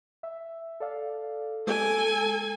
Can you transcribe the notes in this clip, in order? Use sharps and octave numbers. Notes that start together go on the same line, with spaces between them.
E5
A4 D5 F5
G#3 A4 G#5 D7